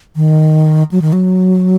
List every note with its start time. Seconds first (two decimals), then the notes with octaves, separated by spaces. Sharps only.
0.16 D#3
0.92 F#3
1.02 D#3
1.13 F#3